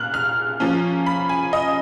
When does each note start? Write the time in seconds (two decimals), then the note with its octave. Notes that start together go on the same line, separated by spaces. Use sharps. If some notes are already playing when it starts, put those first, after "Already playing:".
Already playing: A#2 F6 F#6
0.14 F6
0.60 F3 A#3 C#4
1.06 B5
1.29 G#5
1.53 D#5